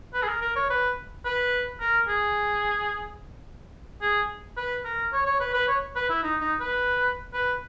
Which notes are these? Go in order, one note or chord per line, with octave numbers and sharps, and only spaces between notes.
B4
G#4
A#4
A#4
C#5
B4
B4
A#4
G#4
G#4
B4
A#4
C#5
C#5
B4
B4
C#5
B4
E4
D#4
D#4
B4
B4